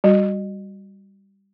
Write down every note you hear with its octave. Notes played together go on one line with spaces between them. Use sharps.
G3 F#4